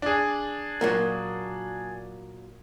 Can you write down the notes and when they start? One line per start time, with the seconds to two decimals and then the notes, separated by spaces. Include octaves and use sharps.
0.02 D4 G#4
0.81 A#2 F#3 A#3